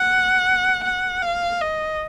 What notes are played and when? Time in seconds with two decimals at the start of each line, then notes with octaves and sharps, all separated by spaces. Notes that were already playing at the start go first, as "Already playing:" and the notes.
Already playing: F#5
0.83 F#5
1.22 F5
1.61 D#5